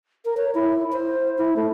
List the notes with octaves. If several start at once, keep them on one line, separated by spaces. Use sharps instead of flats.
A#4
C#5
E4
C5
E4
A3